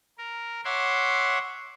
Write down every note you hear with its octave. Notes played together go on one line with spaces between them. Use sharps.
A#4
C#5 E5 F#5 C6 D6